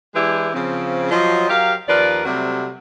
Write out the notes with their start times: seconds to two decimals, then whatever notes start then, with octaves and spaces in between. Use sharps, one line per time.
0.15 E3 G#3 D4 E4 G4 B4
0.54 C#3 F3 C4
1.11 F3 F#3 D#5
1.49 F#3 G4 A#4 F5
1.88 D#2 F3 A#4 B4 D5
2.25 C3 F#3 G3 A3 C4